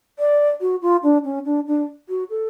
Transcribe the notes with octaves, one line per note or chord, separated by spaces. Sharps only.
D5
F#4
F4
D4
C#4
D4
D4
F#4
A4